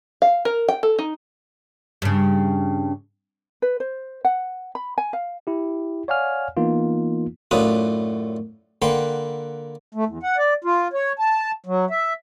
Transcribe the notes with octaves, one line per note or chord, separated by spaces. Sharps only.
F5
A#4
G5
A4
D#4
G2 C#3
B4
C5
F#5
B5
G#5
F5
E4 G4
C#5 D5 F5 F#5 G#5 F6
E3 A#3 B3 D#4 F4
F#2 A2 D4 F4 B4 D#6
D3 A#3 B4 F#5 G5 C6
A3
E2
F#5
D5
F4
C#5
A5
F#3
E5